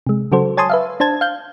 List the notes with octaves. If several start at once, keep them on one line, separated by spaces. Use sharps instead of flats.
C3 G#3
C#3 F#3 F#4 A4 C5
C#5 G#5 A5 C6 D#6
B4 E5 F5
D4 C5 A5 G#6
F5 G6